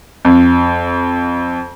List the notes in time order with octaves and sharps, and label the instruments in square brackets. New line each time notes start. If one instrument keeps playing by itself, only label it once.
[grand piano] F2